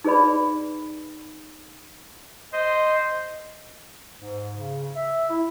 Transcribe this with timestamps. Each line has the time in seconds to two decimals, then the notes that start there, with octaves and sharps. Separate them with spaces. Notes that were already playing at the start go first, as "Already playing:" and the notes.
0.04 D#4 G#4 B4 D5 B5
2.53 C5 D#5
4.20 G#2
4.56 C#3
4.96 E5
5.29 E4